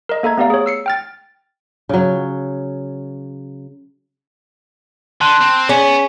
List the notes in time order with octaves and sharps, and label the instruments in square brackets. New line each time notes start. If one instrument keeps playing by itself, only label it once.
[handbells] A#4 D#5
A#3 A4 E5 A#5 G#6
A3 B3 G4 D5 F5 A#5
G#4 C#5
E6 C7 C#7
G5 F6 A6
[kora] C#3 F#3
[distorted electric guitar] D3 [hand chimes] A5 C6 F#6
[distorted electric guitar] C4
[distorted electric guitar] B3 [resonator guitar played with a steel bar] C#4 [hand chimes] G#4